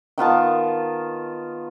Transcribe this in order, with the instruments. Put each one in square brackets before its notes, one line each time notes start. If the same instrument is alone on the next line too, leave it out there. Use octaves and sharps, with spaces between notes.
[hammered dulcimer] D#3 B3 F4 A5